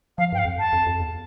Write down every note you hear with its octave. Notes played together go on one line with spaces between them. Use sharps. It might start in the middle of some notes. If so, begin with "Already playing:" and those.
F3 F5
G2 G5
F5
F2
A5
F2
F2
E2